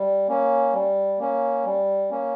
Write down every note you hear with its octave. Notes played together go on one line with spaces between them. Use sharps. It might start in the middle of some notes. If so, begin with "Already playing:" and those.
Already playing: G3
A#3 C#4
G3
A#3 C#4
G3
A#3 C#4